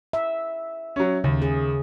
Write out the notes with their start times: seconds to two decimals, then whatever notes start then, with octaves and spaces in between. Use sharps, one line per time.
0.13 E5
0.96 F#3 C#4
1.24 D#2 C#3
1.42 G#4